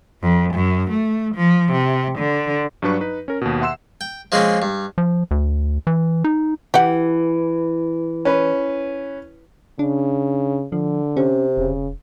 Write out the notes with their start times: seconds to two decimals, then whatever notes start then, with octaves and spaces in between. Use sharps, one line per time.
0.22 F2
0.54 F#2
0.91 A3
1.35 F3
1.72 C3
2.18 D3
2.82 G2 F#3 D4 B4 C#6
3.01 D#4 B4
3.28 C#4 A#4
3.41 D#2 B2
3.61 E5 F#5 C6 E6 E7
4.01 G5
4.32 F3 G#3 A#3 C4 C#4
4.62 G2
4.98 F3
5.31 D2
5.87 E3
6.24 D#4
6.74 E3 G4 F#5
8.25 C#4 B4
9.79 C#3 D4
10.72 D3 F3
11.17 C3 C#4
11.57 E1 C#3